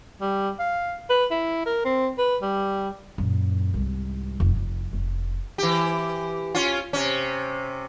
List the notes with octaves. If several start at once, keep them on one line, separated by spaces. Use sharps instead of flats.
G3
F5
B4
E4
A#4
C4
B4
G3
F#2 A#2
C2 G#2
F1 D2
F1
F1
E3 G4
C#4 F4
C3 C#4